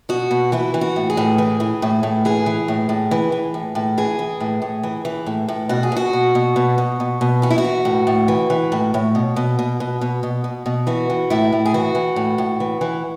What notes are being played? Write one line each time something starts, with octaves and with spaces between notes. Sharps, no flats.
B2 F#4
B2
E3 E4
E3
F#4
A2
G#4
A2
E3
E3
A2
A2
E3 G#4
E3
A2
A2
E3
E3
A2
A2
E3 G#4
E3
A2
A2
E3
E3
A2
A2
B2 F#4
G#4
B2 F#4
B2
B2
B2
B2
B2
B2
E3 F#4
E4
F#4
E3
A2
A2
E3
E3
A2
A2
B2
B2
B2
B2
B2
B2
B2
B2
E3 F#4
E3
A2 E4
A2
G#4
E3 F#4
E3
A2
A2
E3
E3